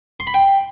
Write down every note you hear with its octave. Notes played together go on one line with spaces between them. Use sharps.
C6
B5
G5